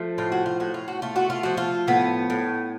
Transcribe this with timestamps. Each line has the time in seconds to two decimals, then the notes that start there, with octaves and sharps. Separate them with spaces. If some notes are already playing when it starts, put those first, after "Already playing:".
Already playing: F3 A3
0.18 A2 F4
0.32 F#4
0.46 F4
0.60 A2 F#4
0.74 F4
0.88 F#4
1.02 A3 F4
1.16 F#4
1.30 F4
1.43 F3 F#4
1.57 F4
1.88 A2 B3
2.30 A2